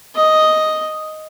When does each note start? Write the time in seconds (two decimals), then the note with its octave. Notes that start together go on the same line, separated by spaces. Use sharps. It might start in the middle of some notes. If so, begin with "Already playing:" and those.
0.16 D#5